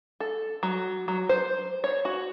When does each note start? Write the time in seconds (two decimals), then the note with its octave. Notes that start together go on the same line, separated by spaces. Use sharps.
0.20 A4
0.63 F#3
1.08 F#3
1.29 C5
1.84 C#5
2.05 F#4